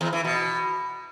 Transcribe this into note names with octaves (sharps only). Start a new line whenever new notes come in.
E2
E3
B2